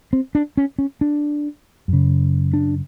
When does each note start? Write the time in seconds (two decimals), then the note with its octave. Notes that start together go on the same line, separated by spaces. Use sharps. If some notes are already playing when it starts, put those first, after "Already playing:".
0.13 C4
0.35 D4
0.57 C#4
0.79 C#4
1.01 D4
1.88 F#2
1.93 C#3
2.54 D4